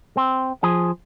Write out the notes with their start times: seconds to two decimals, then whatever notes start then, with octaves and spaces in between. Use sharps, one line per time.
0.17 C4
0.63 F3 G#4